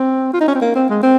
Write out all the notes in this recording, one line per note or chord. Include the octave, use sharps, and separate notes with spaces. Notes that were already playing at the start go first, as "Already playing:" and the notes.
Already playing: C4
F4
D#4
C#4
C4
A#3
C4
G#3
C4